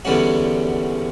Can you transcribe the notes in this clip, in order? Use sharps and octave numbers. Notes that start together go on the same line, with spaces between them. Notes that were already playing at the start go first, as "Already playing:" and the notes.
E2 D3 G3 C#4 F#4